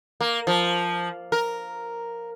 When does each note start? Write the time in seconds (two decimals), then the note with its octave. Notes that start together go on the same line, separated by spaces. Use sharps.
0.21 A#3
0.47 F3
1.32 A#4